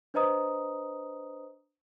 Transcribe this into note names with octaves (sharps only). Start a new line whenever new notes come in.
D4 B4 C5 D#5 A#5 D#6